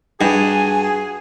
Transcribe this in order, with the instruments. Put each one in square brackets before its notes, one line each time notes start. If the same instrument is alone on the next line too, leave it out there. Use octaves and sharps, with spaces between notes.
[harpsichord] G2 [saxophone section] F#4 G#4 [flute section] G#5